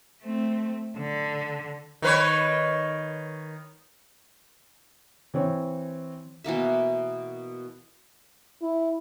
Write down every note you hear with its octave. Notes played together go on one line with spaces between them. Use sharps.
A3 C4
D3
D#3 B4 C#5
E3 C4 C#5
B2 E3 A#3 E5
E4